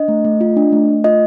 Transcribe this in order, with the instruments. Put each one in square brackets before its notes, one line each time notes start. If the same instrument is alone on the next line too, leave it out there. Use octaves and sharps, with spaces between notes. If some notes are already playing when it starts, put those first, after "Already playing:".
Already playing: [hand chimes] D4 D#5
A3
A3
F4
D4
A3
A3
F4 D#5